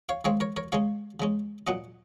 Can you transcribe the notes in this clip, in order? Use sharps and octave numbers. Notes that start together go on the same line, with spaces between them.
C#5 F5
D#3 G#3 C4 C#5 F5
A#4 C#5
A#4 C#5
C#3 G#3 C#4 C#5 F5
C#3 G#3 C#4
A#2 F#3 C#4 D#5 F#5